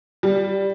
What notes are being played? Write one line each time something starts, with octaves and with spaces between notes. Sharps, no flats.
G3